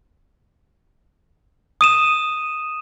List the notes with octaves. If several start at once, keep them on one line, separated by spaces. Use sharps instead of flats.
D#6 D#7 E7